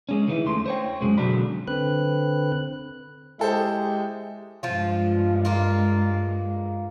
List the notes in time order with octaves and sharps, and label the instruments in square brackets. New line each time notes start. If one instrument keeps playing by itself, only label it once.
[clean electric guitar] G#3 C#4
D#3 E3 E4
D#2 A3 C6
C5 C#5 G5
C2 F#2 C#3 G#3
B2 D3 F#3 D4 B5
[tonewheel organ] D3 C4 B4 F#6
[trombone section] G#3 G4 [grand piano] E4 A4 C5
[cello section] G2 G#3 [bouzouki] F3 F4
[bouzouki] A#3 F4